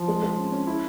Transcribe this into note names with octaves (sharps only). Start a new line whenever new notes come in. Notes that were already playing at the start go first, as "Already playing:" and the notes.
Already playing: F3
G#3
G#3
C#4
C#4
E4